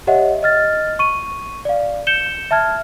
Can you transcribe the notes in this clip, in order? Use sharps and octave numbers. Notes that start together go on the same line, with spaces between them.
G4 C#5 D#5 E5 F#5
D#5 F6 A6
C#6 D#7
D5 F5
G6 C#7 E7 G7
E5 A5 F6 G#6